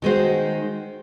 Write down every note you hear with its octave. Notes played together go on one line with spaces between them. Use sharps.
D#3 G#3 D#4 F#4 C5